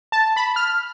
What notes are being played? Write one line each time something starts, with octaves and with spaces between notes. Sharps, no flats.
A5
B5
F6